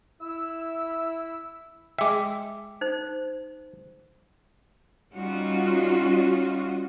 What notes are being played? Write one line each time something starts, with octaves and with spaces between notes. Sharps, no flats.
E4 E6
G#3 E5 G5 D6
D#4 C5
G3 C#4 D#4 F4 F#4